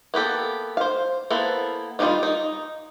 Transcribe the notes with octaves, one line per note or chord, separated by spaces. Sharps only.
A#3 B3 G4 A4
C5 F5
A#3 B3 E4 A4 C5
D#3 G3 A#3 D#4 F4
D#4